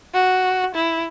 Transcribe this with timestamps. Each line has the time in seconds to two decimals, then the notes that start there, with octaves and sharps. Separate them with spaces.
0.14 F#4
0.75 E4